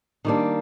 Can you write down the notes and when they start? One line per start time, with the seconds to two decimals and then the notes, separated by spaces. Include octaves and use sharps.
0.25 D#3 G3 A#3 D4